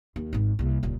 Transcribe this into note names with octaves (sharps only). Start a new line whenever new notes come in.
D#2
G#1 G#2
C2 A#3
D#1 C#2